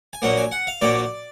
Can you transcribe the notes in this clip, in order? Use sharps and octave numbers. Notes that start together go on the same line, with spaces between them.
G#5
A#1 A#2 F#3 A#3 F#5
G#5
F#5
F5
A#1 A#2 F#3 A#3 D5